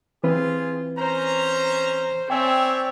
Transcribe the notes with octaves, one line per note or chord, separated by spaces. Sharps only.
E3 C4 F4 G4 G#4 B4
C#4 C5 A#5
C4 C#5 D5 E5 G5 G#5